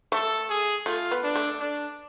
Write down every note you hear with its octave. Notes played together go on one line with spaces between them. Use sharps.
A3 A4
G#4
A3 F4
B3
D4
A3
D4